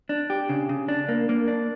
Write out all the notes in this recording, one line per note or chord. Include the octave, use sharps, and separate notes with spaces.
D4
G4
C#3
C#3
D4
A#3
A#3
D4